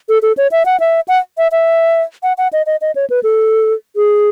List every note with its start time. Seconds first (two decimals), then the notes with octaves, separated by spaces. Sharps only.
0.09 A4
0.22 A4
0.37 C#5
0.52 E5
0.65 F#5
0.80 E5
1.08 F#5
1.38 E5
1.52 E5
2.23 F#5
2.38 F#5
2.53 D#5
2.66 D#5
2.81 D#5
2.95 C#5
3.10 B4
3.23 A4
3.96 G#4